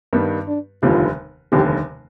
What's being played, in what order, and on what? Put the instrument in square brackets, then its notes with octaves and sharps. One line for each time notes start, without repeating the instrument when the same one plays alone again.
[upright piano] G2 D#3 G3 B3
[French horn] D4
[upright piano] F1 D#2 D3 G3 B3 [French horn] F4
[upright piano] F1 D#2 D3 G3 B3 [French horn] G4